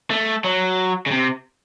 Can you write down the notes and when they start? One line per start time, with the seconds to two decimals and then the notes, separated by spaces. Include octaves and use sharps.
0.11 A3
0.44 F#3
1.06 C#3
1.11 C3